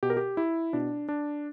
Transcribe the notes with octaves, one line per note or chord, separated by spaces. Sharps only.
B2 G4
A#4
G4
E4
B2 D4
D4